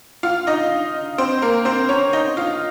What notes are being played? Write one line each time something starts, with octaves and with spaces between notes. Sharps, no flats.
F4 F5
D#4 D#5
C4 C5
A#3 A#4
C4 C5
C#4 C#5
D#4 D#5
F4 F5